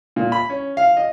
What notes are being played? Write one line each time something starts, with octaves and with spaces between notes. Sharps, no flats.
A#2
B5
C#4
F5
D#5